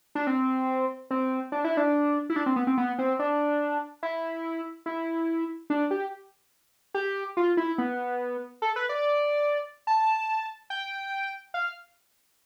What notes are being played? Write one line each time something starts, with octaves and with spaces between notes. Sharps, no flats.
D4
C4
C4
D4
E4
D4
E4
D4
C4
B3
C4
B3
C4
D4
E4
E4
D4
G4
G4
F4
E4
B3
A4
B4
D5
A5
G5
F5